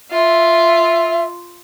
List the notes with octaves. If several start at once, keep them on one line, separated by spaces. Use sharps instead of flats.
F4 E5